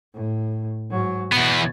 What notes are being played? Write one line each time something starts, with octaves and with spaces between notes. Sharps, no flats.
A2
G#2 F#3
E2 B2 B3